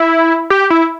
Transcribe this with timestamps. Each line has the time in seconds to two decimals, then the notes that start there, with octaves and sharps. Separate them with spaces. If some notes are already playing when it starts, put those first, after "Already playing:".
Already playing: E4
0.50 G4
0.70 E4